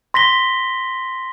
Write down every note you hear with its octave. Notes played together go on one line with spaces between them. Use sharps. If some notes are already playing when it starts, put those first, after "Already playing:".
C6 A#6 B6 G7